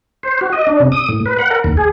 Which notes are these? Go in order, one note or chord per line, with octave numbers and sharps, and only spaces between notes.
C5
F#4
D#5
D4
C3
D#6
A2
B4
F#5
A#4
D#2
G#4